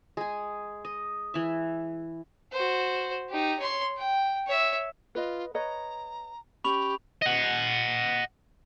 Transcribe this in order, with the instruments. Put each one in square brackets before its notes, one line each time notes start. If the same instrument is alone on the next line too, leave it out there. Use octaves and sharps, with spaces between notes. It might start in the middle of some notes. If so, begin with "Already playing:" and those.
[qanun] G#3 G#4
D#5
E3 E5
[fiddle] F#4 C5
D#4 G4
C#5 C6
G5
C#5 E5
[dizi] F4 [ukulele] B4 D#5
[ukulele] B4 C#5 D#5 [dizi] A#5
[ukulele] C#4 [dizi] G4 [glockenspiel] B5 C#6 F7
[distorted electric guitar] D#5 F#5